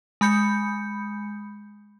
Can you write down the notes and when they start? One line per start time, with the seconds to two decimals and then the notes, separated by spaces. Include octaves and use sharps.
0.21 G#3 B5 G6 C#7